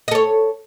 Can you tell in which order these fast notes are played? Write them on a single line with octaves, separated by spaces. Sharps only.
D#5 A4 C#5